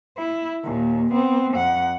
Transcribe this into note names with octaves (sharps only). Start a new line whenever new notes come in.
E4
D#2 A#2
B3 C4
F2 F#5